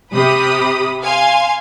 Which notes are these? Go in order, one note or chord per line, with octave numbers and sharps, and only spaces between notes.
C3 G4 B5 D#6
F5 G#5 C6